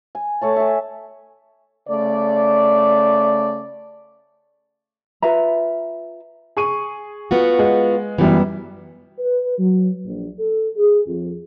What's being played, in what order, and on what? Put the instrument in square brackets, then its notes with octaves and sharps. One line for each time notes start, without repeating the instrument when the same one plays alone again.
[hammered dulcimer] G#5
A3 C#5 A5
E5 G#5
[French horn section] C#3 A3 D5
[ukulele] F4 B4 E5 A#5
[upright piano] G#4 C#6 D#7
[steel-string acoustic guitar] B3 F4 F#4
[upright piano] G#3
[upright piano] F#2 G3 B3 [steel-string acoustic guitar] E3
[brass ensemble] B4
F#3
A#1
A4
G#4
F2